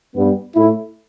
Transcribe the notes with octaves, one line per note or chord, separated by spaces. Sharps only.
G2 G3 B3
A2 A3 E4